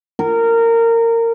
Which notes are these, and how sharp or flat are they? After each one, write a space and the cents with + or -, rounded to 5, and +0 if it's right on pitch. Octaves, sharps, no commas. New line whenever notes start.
A#4 -20